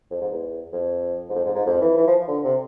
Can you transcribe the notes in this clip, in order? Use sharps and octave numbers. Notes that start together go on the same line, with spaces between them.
F2
G#2
E2
F2
G#2
F2
G#2
G#2
F2
E3
E3
F3
D3
C3